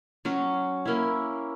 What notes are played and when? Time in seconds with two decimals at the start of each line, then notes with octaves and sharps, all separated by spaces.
0.25 F#3 C#4 F#4
0.85 A#3 C#4 E4